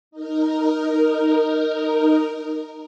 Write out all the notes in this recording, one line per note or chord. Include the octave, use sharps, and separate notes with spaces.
D#4 A#4